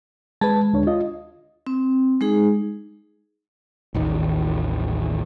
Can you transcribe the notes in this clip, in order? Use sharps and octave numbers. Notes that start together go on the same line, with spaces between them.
G#3 B4 A5
D2 D4 C#5
F4 D#5
C4
G#3 D#4 G#4
A1 D#2 D#3